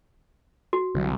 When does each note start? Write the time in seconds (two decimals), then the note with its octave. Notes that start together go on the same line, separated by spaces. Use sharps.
0.73 F#4
0.95 C2 D3 F#3